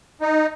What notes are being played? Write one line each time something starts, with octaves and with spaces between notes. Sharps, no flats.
D#4